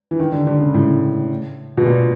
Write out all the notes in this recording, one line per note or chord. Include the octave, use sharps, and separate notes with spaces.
E3
D#3
D3
D3
C#3
A2
B2
A#2